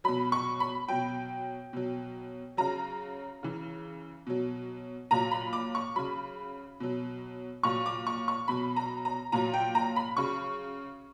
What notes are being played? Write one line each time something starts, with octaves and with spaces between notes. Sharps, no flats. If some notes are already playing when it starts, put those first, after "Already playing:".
B2 F#3 B5
C#6
B5
B2 F#3 G5
B2 F#3
C#3 F#3 A#5
C#3 E3
B2 F#3
A#2 F#3 A#5
B5
D6
C#6
C#3 F#3 B5
B2 F#3
A#2 F#3 C#6
D6
C#6
C#6
B2 F#3 B5
A#5
A#5
A#2 F#3 A#5
G5
A#5
B5
C#3 F#3 C#6